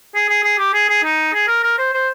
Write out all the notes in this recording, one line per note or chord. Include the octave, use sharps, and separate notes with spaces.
G#4
G#4
G#4
G4
G#4
G#4
D#4
G#4
A#4
A#4
C5
C5